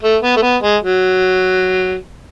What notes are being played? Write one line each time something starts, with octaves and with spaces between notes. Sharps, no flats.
A3
B3
A3
B3
G#3
F#3